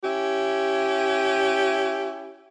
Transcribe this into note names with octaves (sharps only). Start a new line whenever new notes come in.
C#4 E4 G4